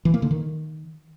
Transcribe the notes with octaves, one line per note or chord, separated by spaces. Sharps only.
E3
A#3
D3
D#3